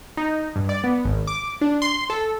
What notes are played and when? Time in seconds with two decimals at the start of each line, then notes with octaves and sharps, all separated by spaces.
0.17 D#4
0.56 G2
0.69 D5
0.84 B3
1.05 G#1
1.27 D6
1.61 D4
1.82 C6
2.10 A4